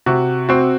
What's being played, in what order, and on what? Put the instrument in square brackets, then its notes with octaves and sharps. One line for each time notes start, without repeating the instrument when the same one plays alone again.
[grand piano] C3 F#4
C4 F#4